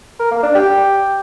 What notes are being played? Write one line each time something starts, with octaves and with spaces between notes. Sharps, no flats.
A#4
A#3
D4
G4